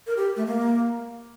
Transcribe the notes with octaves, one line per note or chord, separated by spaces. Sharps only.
A#4
G4
A3
A#3